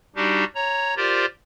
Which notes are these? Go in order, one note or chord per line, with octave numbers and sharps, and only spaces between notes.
G3 D4 D#4 F#4 G4
C#5 A#5
F4 G4 A#4 C5 D5